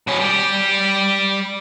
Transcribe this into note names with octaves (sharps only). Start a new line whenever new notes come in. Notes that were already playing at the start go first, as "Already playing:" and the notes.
B2 C#4
G3 G4